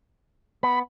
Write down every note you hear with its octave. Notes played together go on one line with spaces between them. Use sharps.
B3 B5